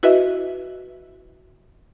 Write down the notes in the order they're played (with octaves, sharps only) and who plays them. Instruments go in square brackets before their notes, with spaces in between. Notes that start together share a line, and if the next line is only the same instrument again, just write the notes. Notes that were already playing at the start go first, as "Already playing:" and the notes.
[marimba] E4 F#4 B4 D#5 E5